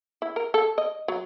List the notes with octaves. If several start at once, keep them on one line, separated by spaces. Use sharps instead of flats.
E4
A#4
A4
D#5
F#3